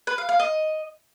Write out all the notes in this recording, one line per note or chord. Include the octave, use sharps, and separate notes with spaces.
B4
F5
F5
D#5